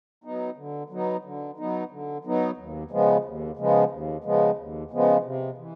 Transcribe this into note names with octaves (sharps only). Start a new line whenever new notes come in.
F#3 B3 D#4
D3
F#3 B3 D#4
D3
F#3 B3 D#4
D3
F#3 B3 D#4
D#2
C#3 F3 G#3 B3
D#2
C#3 F3 G#3 B3
D#2
C#3 F3 G#3 B3
D#2
C#3 F3 G#3 B3
C3
E3